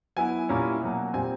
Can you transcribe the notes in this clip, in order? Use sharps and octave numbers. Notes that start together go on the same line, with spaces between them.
F#3 B3 E4 G#5
A#2 G3 A#3 C#4 E4
B2 F#3 A#3
A#2 G3 C4 D#4 G#5